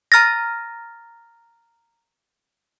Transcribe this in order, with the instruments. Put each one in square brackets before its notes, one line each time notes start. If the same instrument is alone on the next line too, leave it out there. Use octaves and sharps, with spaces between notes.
[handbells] A#5 F6 A6 A#6